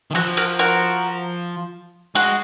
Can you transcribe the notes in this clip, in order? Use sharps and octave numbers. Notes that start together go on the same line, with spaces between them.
D#3
F3 F#4
F#4 A#4
F#4 A#4
G#3 F#4